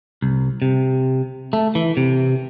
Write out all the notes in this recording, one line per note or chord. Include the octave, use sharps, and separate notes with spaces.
C2
C3
A3
E3
C3